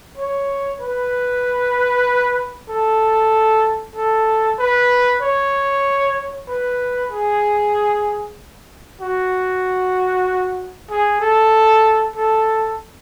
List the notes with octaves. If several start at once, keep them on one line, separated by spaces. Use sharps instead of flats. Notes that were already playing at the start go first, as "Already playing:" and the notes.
C#5
B4
A4
A4
B4
C#5
B4
G#4
F#4
G#4
A4
A4